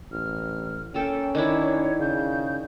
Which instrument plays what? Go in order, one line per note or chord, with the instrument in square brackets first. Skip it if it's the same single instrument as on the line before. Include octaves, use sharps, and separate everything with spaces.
[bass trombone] A1 [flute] F6
[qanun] A#3 A4 [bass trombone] C#4 [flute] G5
[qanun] D#3 D4 E4 [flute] C#5
[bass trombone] C#3 [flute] G6